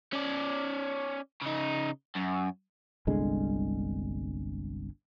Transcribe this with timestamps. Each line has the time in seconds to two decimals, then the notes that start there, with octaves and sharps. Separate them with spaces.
0.13 C#4 D5
1.42 C#3 D#4
2.16 F#2
3.07 G1 C2 D3 G#3